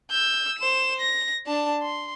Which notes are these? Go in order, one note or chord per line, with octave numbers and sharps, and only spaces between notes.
E6 G6
C5 E7
A#6
D4 A5
C6